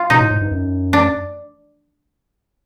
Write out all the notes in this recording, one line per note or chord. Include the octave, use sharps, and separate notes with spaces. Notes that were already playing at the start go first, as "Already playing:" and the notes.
Already playing: F4
B2 D#4
A2
G#2
G2
F#2
D4